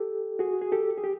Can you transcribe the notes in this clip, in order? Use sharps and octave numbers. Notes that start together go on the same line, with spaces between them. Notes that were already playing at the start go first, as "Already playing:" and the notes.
Already playing: G4 A4
F#4 G#4
G#4
G4 A4
G#4
G4